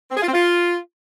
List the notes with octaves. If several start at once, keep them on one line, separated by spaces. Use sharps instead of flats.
C4
G#4
F4
C4
F4